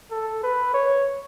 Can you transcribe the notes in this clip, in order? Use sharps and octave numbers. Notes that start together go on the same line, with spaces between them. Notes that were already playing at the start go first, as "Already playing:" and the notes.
A4
B4
C#5